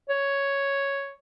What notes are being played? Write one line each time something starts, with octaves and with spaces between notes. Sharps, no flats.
C#5